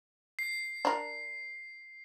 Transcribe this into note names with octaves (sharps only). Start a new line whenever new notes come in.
C7
D4 A#4